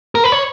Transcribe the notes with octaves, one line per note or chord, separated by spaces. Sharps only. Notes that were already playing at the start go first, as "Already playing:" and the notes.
A#4
B4
C#5